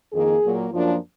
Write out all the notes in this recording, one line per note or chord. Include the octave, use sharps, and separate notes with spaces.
F2 D#3 A#3 D#4 G#4
A#2 F#3 A#3
F#2 F3 A#3 D4 F4